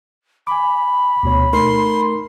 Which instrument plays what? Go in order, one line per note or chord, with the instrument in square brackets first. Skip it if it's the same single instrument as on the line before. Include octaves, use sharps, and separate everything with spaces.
[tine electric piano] G#5 D6 [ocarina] B5
[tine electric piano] D2 B2 C#5
[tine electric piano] A3 D#4 A#4 [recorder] C6